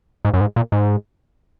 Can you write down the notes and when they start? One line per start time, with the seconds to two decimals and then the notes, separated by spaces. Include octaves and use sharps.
0.25 G#2
0.34 F#2
0.41 G#2
0.56 A#2
0.72 G#2